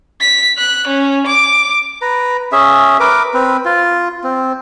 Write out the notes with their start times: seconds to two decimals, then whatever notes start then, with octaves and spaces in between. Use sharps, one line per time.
0.21 B6
0.58 F#6
0.88 C#4
1.27 D6
2.02 B4 A#5
2.52 C#4 G#4 E5
3.00 A#4 B4 D6
3.34 C4 B4
3.65 F4
4.24 C4